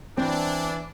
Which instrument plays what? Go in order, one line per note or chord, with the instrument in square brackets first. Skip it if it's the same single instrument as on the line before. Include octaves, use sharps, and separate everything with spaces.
[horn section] E3 D4 [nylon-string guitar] C4